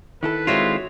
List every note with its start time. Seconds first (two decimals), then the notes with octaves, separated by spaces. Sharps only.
0.23 D#3 E4 A4 B4
0.47 G#3 C4 F4 F#4 C#5 E5